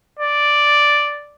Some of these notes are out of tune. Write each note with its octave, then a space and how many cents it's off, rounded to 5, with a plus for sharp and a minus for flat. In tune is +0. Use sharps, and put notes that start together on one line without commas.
D5 +0